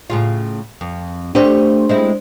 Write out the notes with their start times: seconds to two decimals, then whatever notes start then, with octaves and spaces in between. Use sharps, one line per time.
0.10 A2 C#3 F4
0.81 F2
1.35 A3 C4 D4 G4 C5
1.89 G#3 C4 E4